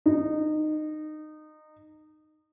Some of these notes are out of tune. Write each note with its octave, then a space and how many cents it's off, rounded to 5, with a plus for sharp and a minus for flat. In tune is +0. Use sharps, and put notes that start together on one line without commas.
D#4 -20